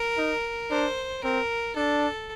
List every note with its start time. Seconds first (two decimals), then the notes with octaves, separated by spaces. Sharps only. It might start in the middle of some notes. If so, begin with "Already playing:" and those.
Already playing: A#4
0.17 D#4
0.70 D4 C5
1.23 C4 A#4
1.76 D4 A4